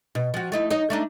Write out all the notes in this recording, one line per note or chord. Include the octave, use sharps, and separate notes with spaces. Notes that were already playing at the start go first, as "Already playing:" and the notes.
B2
F3 F#4
A3 D#4 E4
D#4 C#5 D#5
A3 D4 D#4